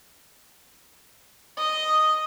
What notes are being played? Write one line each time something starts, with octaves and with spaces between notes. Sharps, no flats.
D#5